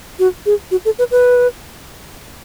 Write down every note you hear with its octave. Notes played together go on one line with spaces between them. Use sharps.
F#4
G#4
F#4
A4
B4
B4